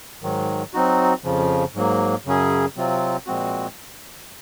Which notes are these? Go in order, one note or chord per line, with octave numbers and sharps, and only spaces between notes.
G#2 D#3 F#3
F#3 C4 D#4 F#4
F2 C#3 F3
G#2 F#3 A#3
F#2 C#3 F#3 C#4 G#4
C3 F#3 C4 F4
A#2 F3 G#3 C4 F#4